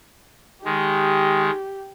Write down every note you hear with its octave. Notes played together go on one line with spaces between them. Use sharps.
D#3 G#3 G4